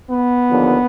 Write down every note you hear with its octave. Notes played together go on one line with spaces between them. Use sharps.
B3
D#2 D3 F3